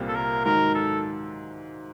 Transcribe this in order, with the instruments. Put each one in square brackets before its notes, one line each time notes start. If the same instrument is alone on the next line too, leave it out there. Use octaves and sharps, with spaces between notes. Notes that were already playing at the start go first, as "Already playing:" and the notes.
Already playing: [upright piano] C2 A#2 G3 C4 F4
[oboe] A4
A#4
[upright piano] G#2 D#3 F#3 [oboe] A#4
[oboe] A4